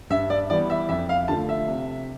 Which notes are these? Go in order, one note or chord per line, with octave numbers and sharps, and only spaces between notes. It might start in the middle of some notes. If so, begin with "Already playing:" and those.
G2 E5
D5
E3 G3 B3 D5
E5
F2 E5
F5
D3 F3 A3 A5
E5
C3